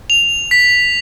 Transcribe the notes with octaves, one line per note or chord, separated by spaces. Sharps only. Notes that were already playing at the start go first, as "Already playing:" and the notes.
F7
B6